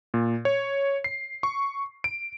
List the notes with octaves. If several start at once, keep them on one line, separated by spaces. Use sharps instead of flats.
A#2
C#5
C7
C#6
D7